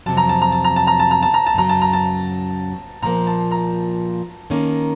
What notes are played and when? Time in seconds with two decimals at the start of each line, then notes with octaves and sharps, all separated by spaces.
0.06 F2 C3 F#3 A5
0.17 A#5
0.29 A5
0.42 A#5
0.52 A5
0.64 A#5
0.76 A5
0.87 A#5
1.00 A5
1.11 A#5
1.22 A5
1.34 A#5
1.46 A5
1.54 F#2 C#3 F#3 A#5
1.69 A5
1.81 A#5
1.93 A5
3.02 A#2 F3 A#3 A#5
3.27 A5
3.51 A#5
4.50 D#3 A#3 C#4